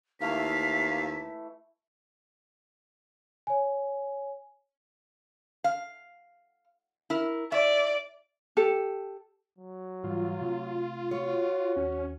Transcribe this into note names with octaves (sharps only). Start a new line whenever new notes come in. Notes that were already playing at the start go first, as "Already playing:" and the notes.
D#2 E3 A3 E4 F5 B6
C#5 G#5
F5
E4 A#4
D5 E5
G4 A4
F#3
G#2 E3 G3 F4
C3 A3 C4
F#4 C#5
D#2 C#4